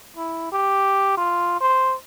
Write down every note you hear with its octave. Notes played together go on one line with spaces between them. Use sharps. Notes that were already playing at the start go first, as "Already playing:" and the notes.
E4
G4
F4
C5